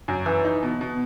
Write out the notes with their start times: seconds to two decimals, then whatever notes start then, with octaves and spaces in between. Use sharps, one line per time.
0.08 F#2
0.26 E3
0.44 D#4
0.63 B2
0.81 B2